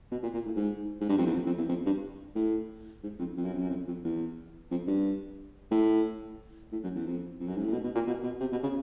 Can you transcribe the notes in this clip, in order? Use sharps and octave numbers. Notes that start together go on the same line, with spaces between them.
B2
A#2
A#2
A2
G#2
G#2
G2
F2
E2
F2
F2
E2
F2
G2
A2
G#2
F2
F2
F#2
F2
F#2
F2
F2
E2
F2
G2
A2
A2
F#2
E2
F2
F2
F#2
G#2
A2
B2
B2
A#2
B2
B2
C3
B2
C#3